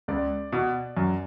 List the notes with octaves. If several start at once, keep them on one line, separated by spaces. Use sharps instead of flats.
C#2 D5
B2
F#2